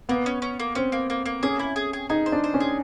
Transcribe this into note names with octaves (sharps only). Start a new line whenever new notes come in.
A#3 B3
C#4
C#4
A#3
C4 C#4
A#3
A#3
A#3
C#4 G#4
E4
G#4
G#4
D#4 G#4
C5
D4
C5
C#4
G#4